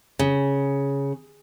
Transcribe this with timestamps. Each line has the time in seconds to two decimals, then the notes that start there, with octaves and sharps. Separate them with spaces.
0.19 C#3